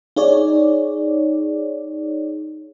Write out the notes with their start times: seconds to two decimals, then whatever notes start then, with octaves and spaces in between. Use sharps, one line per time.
0.16 D#4 G#4 C#5 D5